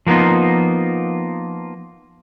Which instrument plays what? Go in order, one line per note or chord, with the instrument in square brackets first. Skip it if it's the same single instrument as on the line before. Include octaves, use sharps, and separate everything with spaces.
[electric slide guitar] F3 A#3 B3 D#4 F4